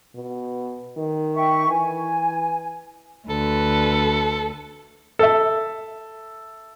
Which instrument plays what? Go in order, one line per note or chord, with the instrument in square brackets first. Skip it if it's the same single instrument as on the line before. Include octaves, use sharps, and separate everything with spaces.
[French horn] B2
D#3
[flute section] E5 G5 C#6
[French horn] E3 [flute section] G#5
[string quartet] D2 B4 [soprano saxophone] A4
[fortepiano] A4 E5